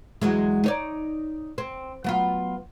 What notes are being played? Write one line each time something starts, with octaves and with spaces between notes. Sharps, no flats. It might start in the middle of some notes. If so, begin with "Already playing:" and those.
E2 F#3 G#3
D#4 C#5 D5
C4
F#3 B3 F4